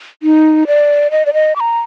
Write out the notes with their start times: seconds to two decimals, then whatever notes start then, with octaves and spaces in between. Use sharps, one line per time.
0.23 D#4
0.67 D5
1.11 D#5
1.26 D5
1.34 D#5
1.56 D6
1.60 A#5